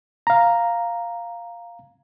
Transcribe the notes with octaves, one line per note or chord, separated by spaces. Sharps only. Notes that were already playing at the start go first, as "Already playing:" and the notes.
F5 A#5